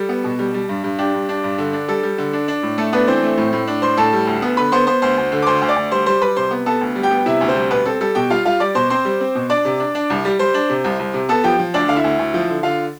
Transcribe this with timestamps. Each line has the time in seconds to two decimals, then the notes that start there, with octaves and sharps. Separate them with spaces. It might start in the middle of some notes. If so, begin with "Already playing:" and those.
Already playing: G3 A4
0.09 B3
0.24 B2
0.39 G3
0.54 G3
0.69 G2
0.84 G2
0.99 D4 G4
1.14 G2
1.29 D4
1.44 G2
1.58 D3
1.73 D4
1.88 G3 A4
2.03 G3
2.18 D3
2.33 D4
2.48 D4
2.63 A2
2.78 A3 A4
2.93 B3 D4 B4
3.07 E3 C4 C5
3.23 A3
3.37 A2
3.53 A2
3.67 D4
3.82 A2 C5 C6
3.97 A2 A4 A5
4.13 G3
4.27 D2
4.42 B3
4.57 D3 B4 B5
4.72 B3 C5 C6
4.87 B3 C5 C6
5.02 D2 C5 C6
5.17 D2
5.32 D3
5.42 D6
5.46 D2 C5 C6
5.61 D2
5.69 D5 D6
5.76 D2
5.91 G3 C5 C6
6.06 G3 C5 C6
6.21 G3 B4 B5
6.36 C3 C5 C6
6.51 B3
6.66 B3 A4 A5
6.81 D2
6.96 G3
7.03 G4 G5
7.11 B3
7.26 C3 E4 E5
7.41 D2
7.48 C4 C5
7.55 G3
7.71 B2 B3 B4
7.85 C4 A4
8.01 G3 A4
8.15 B2 G4 G5
8.30 G3 F4 F5
8.45 G3 F4 F5
8.60 G3 D5 D6
8.75 B2 C5 C6
8.90 C4 C5 C6
9.05 G3
9.21 C4
9.35 B2
9.50 D4 D5 D6
9.65 C3
9.80 D4
9.95 D4
10.10 C2
10.25 G3
10.39 G3 C5 C6
10.54 D4
10.69 C3
10.84 C2
10.99 C2
11.14 C3
11.29 B3 A4 A5
11.44 F3 G4 G5
11.59 F3
11.74 D2 D4 D5
11.88 D3 F5
11.96 E4 E5
12.04 D2
12.19 D2
12.34 F3
12.49 D3
12.63 D3 F4 F5